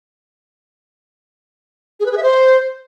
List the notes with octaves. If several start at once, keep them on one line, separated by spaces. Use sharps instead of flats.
G#4
B4
G#4
E5
C5